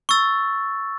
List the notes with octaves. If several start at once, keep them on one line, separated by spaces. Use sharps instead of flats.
C#6 E6 A6